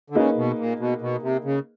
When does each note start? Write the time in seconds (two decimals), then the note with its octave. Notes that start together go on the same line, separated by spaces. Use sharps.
0.10 D3
0.15 C#3 A#3 D#4 G#4 B4
0.37 B2
0.58 A#2
0.79 B2
1.01 B2
1.22 C3
1.44 C#3